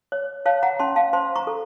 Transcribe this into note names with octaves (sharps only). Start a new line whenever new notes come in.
C#5
C#5 F5 A5
F#5 A#5
C#4 A5 C6
F5 A5
C5 A5 C6
A#5 C#6
A4